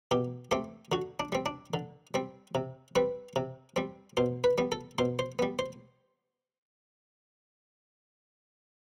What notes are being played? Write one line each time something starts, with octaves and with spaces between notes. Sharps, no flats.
B2 G4
A3 C4 G4
D3 F#4
D4
G3 C4
D4
D3
G3 C4
C3
G3 C4 B4
C3
G3 C4
B2 C5
B4
G3 B3
A4
B2 C5
C5
G3 B3
C5